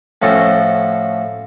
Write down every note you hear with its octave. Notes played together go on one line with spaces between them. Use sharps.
A2 F3 C#4 F#4 A4